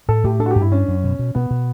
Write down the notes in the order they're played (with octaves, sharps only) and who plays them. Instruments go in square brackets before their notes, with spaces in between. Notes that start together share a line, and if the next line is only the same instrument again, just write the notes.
[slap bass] A2 [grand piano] A4
[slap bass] A2 [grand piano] G4
[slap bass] D4 [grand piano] A4
[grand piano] F#4
G4
[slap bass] G2
[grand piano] E4
[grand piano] C#4 [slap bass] D4
[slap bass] F#2
B2
B2
[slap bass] B2 [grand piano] B3
[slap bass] B2